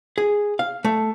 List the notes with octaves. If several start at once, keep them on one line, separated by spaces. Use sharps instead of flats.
G#4
F5
A3